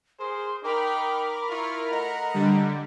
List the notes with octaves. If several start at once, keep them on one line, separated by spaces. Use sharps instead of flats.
G#4 A#4 C5 C6
D#4 A#4 G5 B5 D6 F6
E4 F4 C#6
A3 D#5 F#5 A#5
D3 G3